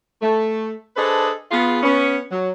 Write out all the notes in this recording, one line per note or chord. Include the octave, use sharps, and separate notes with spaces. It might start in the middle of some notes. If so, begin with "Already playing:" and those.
A3
D4 G#4 A4 B4 C5 D#5
B3 F4 G#4
B3 C#4
F#3